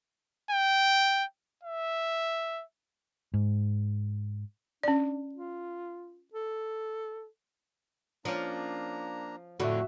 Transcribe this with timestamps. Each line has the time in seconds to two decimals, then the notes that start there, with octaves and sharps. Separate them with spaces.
0.50 G5
1.64 E5
3.34 G#2
4.83 C#4 D4 D5
5.35 F4
6.34 A4
8.25 F3 A#3 C#4 D4 A#5
9.60 F2 A2 D3 A3 F#4 E5